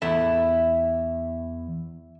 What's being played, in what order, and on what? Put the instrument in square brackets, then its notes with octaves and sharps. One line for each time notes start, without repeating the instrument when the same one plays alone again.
[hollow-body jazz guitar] E2 A4 E5 [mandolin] E4